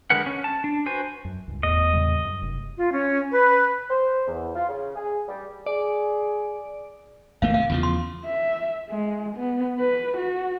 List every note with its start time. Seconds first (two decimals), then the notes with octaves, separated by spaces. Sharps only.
0.10 D3 G#3 A#4 B4 F#5
0.26 C#4
0.44 A5
0.64 D4
0.86 F#4 B4 C5 G#5
1.25 F#2
1.48 C#2 G2
1.63 F1 E2 A2 D#5
1.93 A2 C#3 G3
2.25 F#2
2.42 F1
2.78 F4
2.92 C#4
3.31 B4
3.89 C5
4.27 E2
4.56 F4
4.69 C#3
4.96 G#4
5.28 G3
5.66 G#4 D5
7.42 G#1 A3 A#3 F5
7.54 C3 F5
7.70 E2 C#3 F3
7.83 C6
8.25 E5
8.90 G#3
9.37 B3
9.79 B4
10.17 F#4